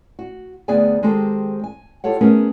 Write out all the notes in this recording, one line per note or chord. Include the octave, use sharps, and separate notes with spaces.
F#4
D2 B3 C4 G#4 D5 G#5
D#3 G#3 C4 G4 A4 C5
G#5
F4 G4 A4 C#5 F#5
A3 B3 C#4 G#4 A#4